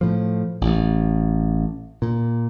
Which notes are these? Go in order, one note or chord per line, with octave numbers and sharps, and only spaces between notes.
A2 F3
A1
A#2